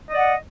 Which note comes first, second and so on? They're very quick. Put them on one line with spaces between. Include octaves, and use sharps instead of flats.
D#5 D5 F#5